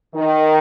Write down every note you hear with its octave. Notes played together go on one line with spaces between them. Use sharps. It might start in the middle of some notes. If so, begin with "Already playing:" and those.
D#3